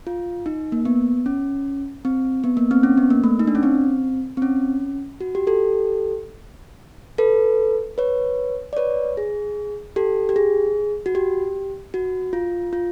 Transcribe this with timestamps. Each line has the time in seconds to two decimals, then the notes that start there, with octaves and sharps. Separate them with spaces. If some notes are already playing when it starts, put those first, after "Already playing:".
0.07 F4
0.46 D#4
0.72 A#3
0.85 B3
1.26 C#4
2.05 C4
2.44 B3
2.57 A#3
2.71 C4
2.83 C#4
2.97 B3
3.10 A#3
3.24 A3
3.39 D#4
3.47 D4
3.55 C#4
3.63 C4
4.37 C4
4.42 C#4
5.21 F#4
5.35 G4
5.47 G4 A4
7.18 A4 B4
7.98 B4 C#5
8.73 D5
8.77 B4 C#5
9.17 G#4
9.96 G4 A4
10.29 G4
10.36 G#4
11.06 F#4
11.15 G4
11.94 F#4
12.33 F4
12.73 F4